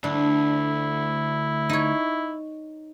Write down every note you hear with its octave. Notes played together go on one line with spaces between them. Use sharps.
D2 D4 E4
D#4 C#5